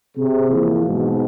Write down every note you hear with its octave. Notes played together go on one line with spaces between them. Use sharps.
C3 G#4
E3 F3 A#3 E4
G#2 B2